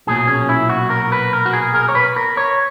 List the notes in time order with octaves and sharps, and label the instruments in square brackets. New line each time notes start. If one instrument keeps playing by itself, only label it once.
[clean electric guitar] B1 A#2 F#3 G#4
C#4
E4
F#4
A#4
B4
A#4
F#4
G#4
A#4
C#5
B4
A#4
C#5